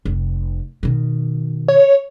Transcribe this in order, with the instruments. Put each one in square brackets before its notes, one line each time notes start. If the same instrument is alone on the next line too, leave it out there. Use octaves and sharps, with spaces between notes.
[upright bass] F1
B2 D#3
[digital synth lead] C#5